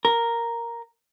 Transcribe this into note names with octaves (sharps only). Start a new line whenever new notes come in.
A#4